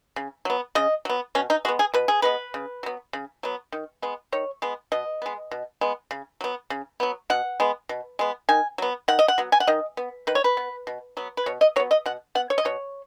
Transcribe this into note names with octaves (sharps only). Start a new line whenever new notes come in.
C#3
F#3 B3
C#3 D#5
F#3 B3
B2 C#4
D#4
G#3 B3 F#4
G#4
B2 B4
G#4
G#3 B3 B4
C#3
F#3 B3
C#3
F#3 B3
D#3
G#3 B3
D#3 C#5
G#3 B3
B2 D#5
G#3 B3
B2
G#3 B3
C#3
F#3 B3
C#3
F#3 B3
B2 F#5
G#3 B3
B2
G#3 B3
D#3 G#5
F#3 B3
D#3 F#5
D#5
F#5
F#3 B3
G#5
F#5
D#3 D#5
B3
D#3 B4
C#5
B4
B3
B2
F#3 B3
B4
B2 C#5
D#5
F#3 B3 C#5
D#5
B2 F#5
B3 F#5
C#5
D#5
B2 C#5